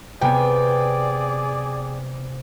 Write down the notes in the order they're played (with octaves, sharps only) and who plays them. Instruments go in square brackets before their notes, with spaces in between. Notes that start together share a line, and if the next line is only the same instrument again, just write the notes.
[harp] C3 B3 G#5 [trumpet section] G#4 D5 [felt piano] G5